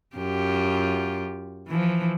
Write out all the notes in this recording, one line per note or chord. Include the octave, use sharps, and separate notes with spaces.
F#2 F4 G4
E3 F3